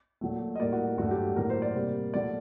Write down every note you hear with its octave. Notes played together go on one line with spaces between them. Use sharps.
A#2 F#3 A3
D#5
A2 G3 A#3 D5
F#4
G2 F#3 A3 F#4
G4
A2 F#3 A#3 A#4
C5
D5
C3 G3 A#3
A#2 F#3 A3 D5